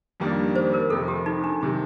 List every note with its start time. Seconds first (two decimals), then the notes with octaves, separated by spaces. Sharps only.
0.20 F2 D#3 G3 A#3 D4
0.55 C5
0.73 A#4
0.90 F1 F2 C3 A4
1.08 G4
1.26 D#4
1.44 D4
1.61 C3 D#3 G3 D#4